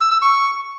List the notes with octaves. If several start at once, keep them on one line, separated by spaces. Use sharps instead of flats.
E6
E6
C#6